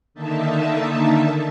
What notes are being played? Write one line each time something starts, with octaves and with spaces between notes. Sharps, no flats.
D3 D#3 A#3 D#4 E5 A5